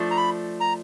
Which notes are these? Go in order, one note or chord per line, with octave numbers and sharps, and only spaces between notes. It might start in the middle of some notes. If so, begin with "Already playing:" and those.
Already playing: F3 A3 D4
A#5
B5
A#5